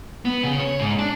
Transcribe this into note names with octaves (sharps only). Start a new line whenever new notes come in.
B3
C#3
C#5
G#2
D4